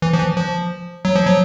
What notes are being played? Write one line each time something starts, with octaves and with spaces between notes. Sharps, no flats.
E3
F3
E3
F3
F#3
F3
F#3